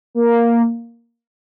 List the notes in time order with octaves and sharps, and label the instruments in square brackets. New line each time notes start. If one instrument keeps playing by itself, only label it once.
[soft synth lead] A#3